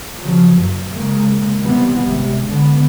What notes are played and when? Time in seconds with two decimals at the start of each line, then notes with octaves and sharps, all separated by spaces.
0.21 C#3 F3 F#3
0.56 F#1 F#2
0.89 C#3 G#3 A#3
1.61 C3 E3 G3 B3 C4
1.99 G#1 C3
2.47 D3 B3